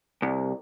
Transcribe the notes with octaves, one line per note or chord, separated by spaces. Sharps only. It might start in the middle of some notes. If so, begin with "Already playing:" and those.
C2